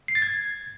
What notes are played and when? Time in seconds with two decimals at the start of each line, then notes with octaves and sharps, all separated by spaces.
0.08 C7
0.15 A6
0.22 G#6